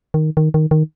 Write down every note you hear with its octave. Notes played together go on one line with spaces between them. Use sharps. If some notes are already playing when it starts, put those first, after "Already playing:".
D#3
D#3
D#3
D#3